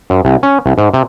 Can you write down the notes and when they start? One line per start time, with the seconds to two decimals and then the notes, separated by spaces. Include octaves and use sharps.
0.10 F#2
0.25 C2
0.43 C#4
0.66 C2
0.78 G#2
0.94 C3